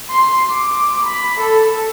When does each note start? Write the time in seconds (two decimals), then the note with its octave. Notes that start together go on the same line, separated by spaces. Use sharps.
0.10 C6
0.51 D6
1.06 B5
1.40 A4